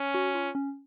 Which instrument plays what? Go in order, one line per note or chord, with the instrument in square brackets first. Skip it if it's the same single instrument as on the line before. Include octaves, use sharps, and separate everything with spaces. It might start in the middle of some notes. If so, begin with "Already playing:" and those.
Already playing: [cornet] C#4
[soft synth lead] F#4
F4
C#4